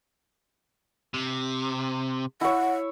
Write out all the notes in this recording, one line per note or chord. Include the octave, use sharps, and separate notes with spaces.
C3
E4 C#5 F#5